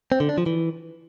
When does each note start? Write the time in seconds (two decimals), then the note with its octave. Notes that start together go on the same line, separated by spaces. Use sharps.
0.12 C4
0.20 D3
0.29 D4
0.38 F3
0.46 E3